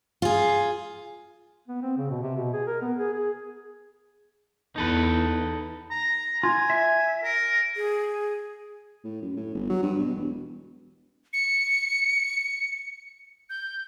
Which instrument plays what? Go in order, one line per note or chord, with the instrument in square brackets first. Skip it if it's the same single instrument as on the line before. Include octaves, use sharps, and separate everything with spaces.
[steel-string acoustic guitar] F4 G#4
[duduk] B3
C4
C#3
B2
C3
B2
G#4
A#4
B3
G#4
G#4
[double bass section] E2 [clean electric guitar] D#4 A4 B4
[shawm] A#5
[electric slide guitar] F4 [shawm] G#5
[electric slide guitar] E5
[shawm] A#4
[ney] G#4
[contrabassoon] A2
F#2
A2
G1
F#3
G2
B2
E1
[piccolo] C#7
G6